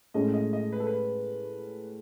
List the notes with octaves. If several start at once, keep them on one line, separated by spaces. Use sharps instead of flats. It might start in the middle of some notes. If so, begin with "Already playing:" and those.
A2 G#3 C#4 D#5
D#5
D#5
B4
A4
B4